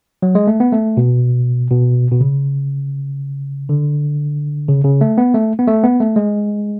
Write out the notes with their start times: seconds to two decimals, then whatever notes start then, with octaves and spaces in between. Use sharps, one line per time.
0.22 F#3
0.35 G#3
0.47 A3
0.60 B3
0.72 A3
0.97 B2
1.71 B2
2.11 B2
2.20 C#3
3.69 D3
4.68 C#3
4.84 C#3
5.01 A3
5.18 B3
5.34 A3
5.59 B3
5.67 A3
5.84 B3
6.00 A3
6.16 G#3